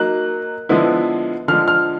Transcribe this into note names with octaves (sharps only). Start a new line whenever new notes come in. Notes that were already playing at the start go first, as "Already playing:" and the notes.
Already playing: F#3 A#3 D#4 F#6
D3 F3 G#3 B3 E4
D3 F3 G#3 F6
F6